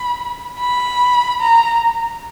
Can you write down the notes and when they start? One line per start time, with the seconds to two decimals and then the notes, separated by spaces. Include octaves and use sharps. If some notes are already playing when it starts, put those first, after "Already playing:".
Already playing: B5
0.59 B5
1.40 A#5